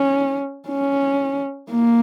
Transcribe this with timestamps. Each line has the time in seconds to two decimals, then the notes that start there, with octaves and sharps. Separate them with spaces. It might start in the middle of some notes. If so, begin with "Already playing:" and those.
Already playing: C#4
0.68 C#4
1.71 A#3